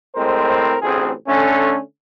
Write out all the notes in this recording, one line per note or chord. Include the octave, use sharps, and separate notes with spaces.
A2 G#3 C4 A#4 C5
A1 D2 C4 G#4
D3 A3 C#4